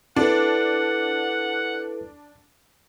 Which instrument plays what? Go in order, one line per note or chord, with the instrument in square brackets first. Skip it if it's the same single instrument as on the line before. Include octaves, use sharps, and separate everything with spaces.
[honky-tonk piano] D4 [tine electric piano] E4 A4 B4 [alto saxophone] F#5